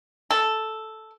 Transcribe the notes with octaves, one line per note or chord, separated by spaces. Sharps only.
A4